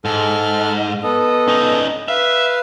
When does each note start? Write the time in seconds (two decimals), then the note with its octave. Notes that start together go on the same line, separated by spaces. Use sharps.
0.05 G#2 A4 F6
1.03 B3 A4 D#5
1.48 C#4 D#4
2.08 B4 E5 F5